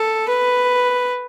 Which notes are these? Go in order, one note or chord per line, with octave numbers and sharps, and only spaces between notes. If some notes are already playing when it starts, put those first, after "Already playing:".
Already playing: A4
B4